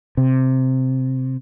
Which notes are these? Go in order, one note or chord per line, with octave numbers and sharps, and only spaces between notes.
C3